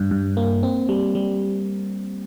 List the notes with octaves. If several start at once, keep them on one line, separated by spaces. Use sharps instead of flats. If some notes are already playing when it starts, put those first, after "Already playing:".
Already playing: G2
G2
A#3
C4
G3
G3